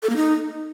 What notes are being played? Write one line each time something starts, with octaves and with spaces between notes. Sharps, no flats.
A4
A#3
D#4